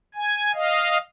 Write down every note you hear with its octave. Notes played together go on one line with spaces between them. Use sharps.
G#5
D#5 F5